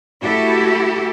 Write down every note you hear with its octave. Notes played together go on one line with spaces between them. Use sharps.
A3 E4 F#4 G4 A4